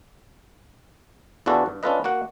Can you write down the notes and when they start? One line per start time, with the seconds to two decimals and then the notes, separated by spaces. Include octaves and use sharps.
1.46 E2 E3 D4 F4 F#4 A4
1.66 G2
1.83 C#4 D4 F4 A4 B4 D#5
2.04 A#3 F#4 F#5